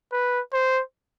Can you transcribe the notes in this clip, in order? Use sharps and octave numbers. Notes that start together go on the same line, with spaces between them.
B4
C5